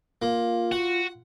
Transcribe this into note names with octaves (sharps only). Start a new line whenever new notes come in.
A#3 F4
F#4 F#5